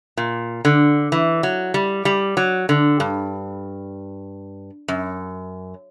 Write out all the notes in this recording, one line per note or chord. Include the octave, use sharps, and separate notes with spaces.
A#2
D3
E3
F#3
G3
G3
F#3
D3
G2
F#2